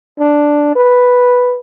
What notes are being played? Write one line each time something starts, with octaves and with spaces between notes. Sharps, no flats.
D4
B4